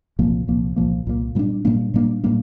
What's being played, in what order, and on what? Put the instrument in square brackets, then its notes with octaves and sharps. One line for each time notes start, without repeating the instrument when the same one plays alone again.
[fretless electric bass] C2 A#2 F3 A#3
C2 A#2 F3 A#3
C2 A#2 F3 A#3
C2 A#2 F3 A#3
A#2 G3 A#3 D4
A#2 G3 A#3 D4
A#2 G3 A#3 D4
A#2 G3 A#3 D4